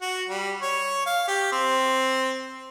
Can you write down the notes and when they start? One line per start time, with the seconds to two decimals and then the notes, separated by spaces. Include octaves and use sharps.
0.02 F#4
0.28 G3
0.62 C#5
1.06 F5
1.28 G4
1.52 C4